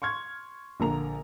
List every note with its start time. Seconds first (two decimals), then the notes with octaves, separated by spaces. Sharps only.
0.02 C6 C#6 F6 G#6
0.80 A#1 D3 A#3 A#5 F7